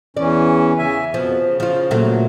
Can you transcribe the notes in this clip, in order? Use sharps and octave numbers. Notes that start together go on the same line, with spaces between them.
E2 E3 C#4 D5
C#3 E5 G#5
F2 B2 F3 B3
C#3
F3 F4
A#2 F#3 A3